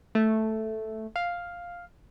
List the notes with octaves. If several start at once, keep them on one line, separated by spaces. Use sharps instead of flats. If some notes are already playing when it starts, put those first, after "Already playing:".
A3
F5